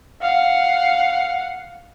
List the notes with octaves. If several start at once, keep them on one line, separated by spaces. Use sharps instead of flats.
F5 F#5